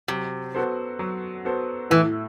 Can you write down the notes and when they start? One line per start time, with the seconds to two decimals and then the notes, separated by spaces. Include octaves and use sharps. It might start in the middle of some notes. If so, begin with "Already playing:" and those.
0.08 C3 F#3
0.55 B3 F#4 A4 C5
0.99 F#3
1.45 B3 F#4 A4 C5
1.90 A2 E3